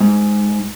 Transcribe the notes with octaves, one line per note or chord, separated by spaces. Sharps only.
G#2